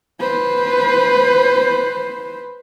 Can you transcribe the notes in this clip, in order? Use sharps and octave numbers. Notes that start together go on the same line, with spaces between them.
B4 C5